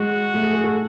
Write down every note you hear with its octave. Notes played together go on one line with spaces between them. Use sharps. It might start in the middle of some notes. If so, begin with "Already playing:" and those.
Already playing: G#3 F#4
A3
G#4
G#4
A4